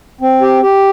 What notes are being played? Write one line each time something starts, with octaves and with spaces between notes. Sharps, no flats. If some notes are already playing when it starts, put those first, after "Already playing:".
C4
G4
G4